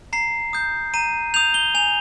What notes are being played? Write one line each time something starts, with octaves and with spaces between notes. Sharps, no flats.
A#5 C7
D#6 G6
A#5 D#7
D#6 G6 F7
G7
G#5 F7